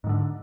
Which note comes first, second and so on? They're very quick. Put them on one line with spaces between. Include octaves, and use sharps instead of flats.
G#2 D#3 D3